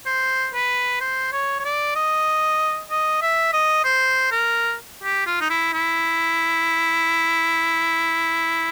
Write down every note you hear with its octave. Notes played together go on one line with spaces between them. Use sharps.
C5
B4
C5
C#5
C#5
D5
D#5
D#5
E5
D#5
C5
A#4
G4
F4
D#4
E4
E4